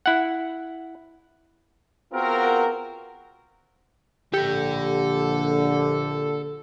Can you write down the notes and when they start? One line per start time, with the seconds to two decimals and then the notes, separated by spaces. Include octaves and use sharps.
0.06 E4 F#5
2.13 B3 C4 F4 F#4 G#4 A#4
4.34 A#1 D3 G4 A4 B5